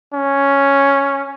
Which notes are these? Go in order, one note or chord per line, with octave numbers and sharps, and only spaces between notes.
C#4